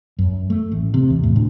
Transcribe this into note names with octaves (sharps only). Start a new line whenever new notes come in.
F#2
A3
A1
C3
E2
A2
D2